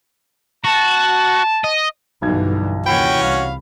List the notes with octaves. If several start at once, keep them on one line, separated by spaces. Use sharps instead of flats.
F#4 A5
D#5
B1 G2 D3 E3 G#6
D#2 C3 E3 C#4 F#4 C#5 G5 B5
C2 F5